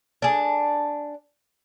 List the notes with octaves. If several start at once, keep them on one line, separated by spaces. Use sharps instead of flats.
D4 G#4